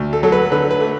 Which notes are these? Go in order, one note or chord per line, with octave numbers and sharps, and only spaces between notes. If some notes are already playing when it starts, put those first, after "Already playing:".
Already playing: D2
A4
F#3 A4
B4
D3 B4
B4
A3